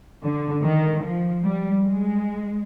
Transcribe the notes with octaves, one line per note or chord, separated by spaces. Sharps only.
D3
D#3
F3
G3
G#3